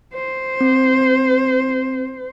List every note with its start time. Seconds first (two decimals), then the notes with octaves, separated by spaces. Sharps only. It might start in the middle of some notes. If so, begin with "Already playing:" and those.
0.14 C5
0.61 C4